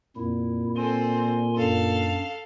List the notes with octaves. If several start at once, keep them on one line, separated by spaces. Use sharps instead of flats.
F2 A#2 E4
C4 A4 G#5 C6
F#2 D4 A4 F5